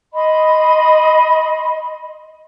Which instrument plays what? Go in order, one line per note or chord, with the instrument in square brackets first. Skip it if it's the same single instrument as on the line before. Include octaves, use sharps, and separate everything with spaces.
[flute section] D#5 B5 C6